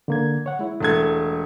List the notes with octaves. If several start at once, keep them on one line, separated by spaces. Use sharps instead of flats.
D3 A#3 G#6
C#5 F#5
G#3 E4
E1 A3 G#6